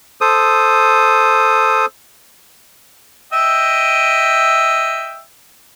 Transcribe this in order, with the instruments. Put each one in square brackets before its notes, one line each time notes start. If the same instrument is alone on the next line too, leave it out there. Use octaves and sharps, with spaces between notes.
[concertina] A4 C5 D#6
[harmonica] D#5 E5 G5